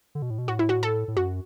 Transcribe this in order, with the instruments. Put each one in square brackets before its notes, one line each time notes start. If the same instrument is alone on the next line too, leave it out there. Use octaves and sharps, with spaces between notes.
[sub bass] D3
B2
A2
B2
[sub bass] A2 [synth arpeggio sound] F#4
[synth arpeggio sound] E4
F#4
A4
[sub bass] A2
[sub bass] F#2 [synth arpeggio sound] F#4